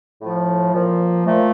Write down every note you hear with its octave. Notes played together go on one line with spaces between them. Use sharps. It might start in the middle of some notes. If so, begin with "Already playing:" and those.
A2 F3
A#2 F3
A#2 F3 A3